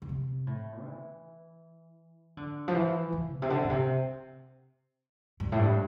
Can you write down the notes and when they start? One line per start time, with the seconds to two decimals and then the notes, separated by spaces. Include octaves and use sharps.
0.02 D3
0.09 C3
0.47 A2
0.85 E3
2.37 D3
2.68 F3
2.75 E3
3.12 E3
3.35 A#2
3.42 C3
3.50 D3
3.64 A#2
3.70 C3
5.40 G2
5.52 A2
5.59 G2